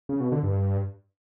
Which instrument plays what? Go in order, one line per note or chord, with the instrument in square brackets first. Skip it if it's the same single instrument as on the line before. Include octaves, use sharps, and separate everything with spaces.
[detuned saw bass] C#3
B2
D3
G2